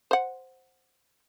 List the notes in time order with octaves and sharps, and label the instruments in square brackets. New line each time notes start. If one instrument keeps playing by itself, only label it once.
[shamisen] C5 F#5